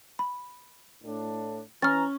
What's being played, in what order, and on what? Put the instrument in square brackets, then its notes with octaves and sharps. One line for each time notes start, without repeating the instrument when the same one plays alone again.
[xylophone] B5
[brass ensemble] A2 D4
[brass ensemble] E3 A#5 [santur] C#4 [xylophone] F6 A6